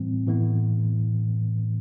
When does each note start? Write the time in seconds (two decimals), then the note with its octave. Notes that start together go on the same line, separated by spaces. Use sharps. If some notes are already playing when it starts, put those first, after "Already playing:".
Already playing: A2 E3 G3 C4
0.27 A2 E3 B3